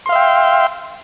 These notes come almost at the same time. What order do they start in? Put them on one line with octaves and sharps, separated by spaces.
C6 F5 E5 G5